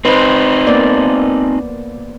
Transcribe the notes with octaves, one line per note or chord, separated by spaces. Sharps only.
C4 D#4 B4 C5
A#3 B3 D5